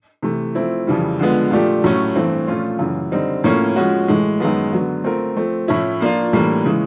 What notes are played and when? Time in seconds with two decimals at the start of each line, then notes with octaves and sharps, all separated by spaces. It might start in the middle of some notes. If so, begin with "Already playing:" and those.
0.22 C3 E3 A3
0.55 F3 A3 C4 E4
0.87 F2 C#3 E3 G3
1.19 D3 F3 G#3 B3
1.51 A#2 F3 A3 D4 G4
1.84 A2 F#3 A3 C#4
2.16 G2 E3 A3 C4
2.47 A#2 F3 A3 C#4 F4
2.79 F#2 C#3 E3
3.12 D3 G3 C4 D#4
3.44 A2 F3 A#3 C#4
3.76 F3 G#3 C#4 F#4
4.08 A2 E3 G#3
4.40 F#2 D#3 G#3 B3
4.72 D3 F#3 B3
5.04 A3 C4 F4 A#4
5.36 F3 A3 C4
5.68 A2 F3 A3 C#4 E4
6.01 F3 A#3 D4 F4
6.33 A2 E3 G3 A#3 D4
6.64 C#3 E3 G#3